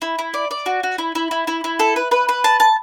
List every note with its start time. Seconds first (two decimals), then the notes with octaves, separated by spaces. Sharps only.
0.02 E4
0.19 E4
0.34 D5
0.51 D5
0.66 F#4
0.83 F#4
0.98 E4
1.15 E4
1.31 E4
1.47 E4
1.64 E4
1.79 A4
1.96 B4
2.11 B4
2.29 B4
2.44 A5
2.60 A5